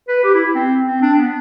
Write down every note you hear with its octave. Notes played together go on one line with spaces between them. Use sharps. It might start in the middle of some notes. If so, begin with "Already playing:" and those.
B4
G4
E4
C4
C4
D4
B3